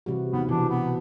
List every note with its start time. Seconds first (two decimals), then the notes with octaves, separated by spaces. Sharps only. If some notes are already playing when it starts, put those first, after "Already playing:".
0.06 C3 E3 G3 F#4
0.33 D#2 B3
0.49 C2 B2 E3 D4
0.70 B3